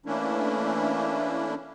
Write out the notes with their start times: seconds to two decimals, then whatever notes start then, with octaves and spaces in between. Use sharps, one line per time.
0.06 E3 A3 A#3 C#4 D4 E4